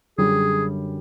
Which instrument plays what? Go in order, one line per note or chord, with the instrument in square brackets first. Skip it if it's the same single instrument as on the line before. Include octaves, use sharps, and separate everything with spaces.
[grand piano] F#2 D3 G3 [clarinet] G#4